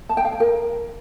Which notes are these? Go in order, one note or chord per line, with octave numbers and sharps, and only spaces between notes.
A5
G5
F5
G#5
A#4